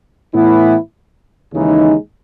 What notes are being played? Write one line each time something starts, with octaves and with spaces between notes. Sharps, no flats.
A2 E3 B3 E4
D#2 C#3 E3 G#3 D#4